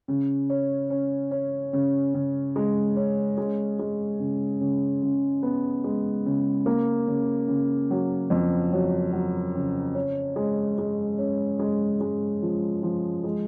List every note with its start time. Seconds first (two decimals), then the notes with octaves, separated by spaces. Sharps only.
0.08 C#3
0.50 C#4
0.90 C#4
1.31 C#4
1.73 C#3
2.14 C#3
2.56 G#3
2.96 C#4
3.37 G#3
3.79 G#3
4.19 C#3
4.60 C#3
5.02 C#3
5.43 B3
5.84 G#3
6.26 C#3
6.66 A#3
7.07 C#3
7.48 C#3
7.90 F#3
8.30 F2
8.72 F#3
9.13 F#3
9.55 C#3
9.95 C#4
10.36 G#3
10.78 G#3
11.18 C#4
11.59 G#3
12.01 G#3
12.42 F3
12.83 F3
13.24 G#3